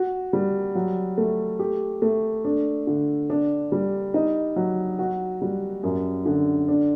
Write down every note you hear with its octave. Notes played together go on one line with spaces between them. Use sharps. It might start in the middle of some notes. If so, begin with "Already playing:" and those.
Already playing: F#4
G3
F#3
A3
G4
A3
D4
D3
D4
G3
D#4
F#3
F#4
G3
F#2
D3
D4